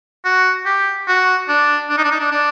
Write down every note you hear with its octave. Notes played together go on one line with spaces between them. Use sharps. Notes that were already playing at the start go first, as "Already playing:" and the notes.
F#4
G4
F#4
D4
D4
D#4
D4
D#4
D4
D4